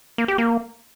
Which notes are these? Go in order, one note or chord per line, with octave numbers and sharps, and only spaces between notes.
A#3
G4
A#3